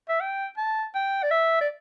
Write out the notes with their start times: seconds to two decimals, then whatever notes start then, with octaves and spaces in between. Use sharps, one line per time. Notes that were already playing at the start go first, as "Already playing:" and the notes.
0.09 E5
0.21 G5
0.58 A5
0.95 G5
1.23 D5
1.31 E5
1.61 D5